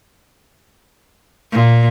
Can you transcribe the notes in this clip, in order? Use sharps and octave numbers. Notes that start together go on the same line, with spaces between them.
A#2